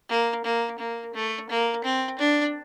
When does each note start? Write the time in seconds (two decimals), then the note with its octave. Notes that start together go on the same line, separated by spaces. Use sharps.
0.09 A#3
0.44 A#3
0.79 A#3
1.14 A3
1.50 A#3
1.84 C4
2.19 D4